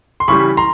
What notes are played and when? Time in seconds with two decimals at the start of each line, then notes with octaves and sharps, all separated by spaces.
0.20 C6
0.28 C#3 E3 G3 B5 C#6
0.57 A#5 C6